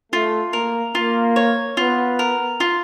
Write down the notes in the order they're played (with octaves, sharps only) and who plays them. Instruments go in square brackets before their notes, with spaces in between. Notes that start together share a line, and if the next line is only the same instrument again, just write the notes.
[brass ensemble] A3 [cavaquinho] F4
[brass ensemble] A#3 [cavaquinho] A#4
[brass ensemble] A#3 [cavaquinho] F4
[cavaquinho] C#5
[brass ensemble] B3 [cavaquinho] F4
[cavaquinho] A#4
F4